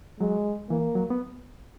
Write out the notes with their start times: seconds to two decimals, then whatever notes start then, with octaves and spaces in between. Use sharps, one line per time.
0.20 F#3 G#3
0.70 E3 A#3
0.95 F#3
1.10 B3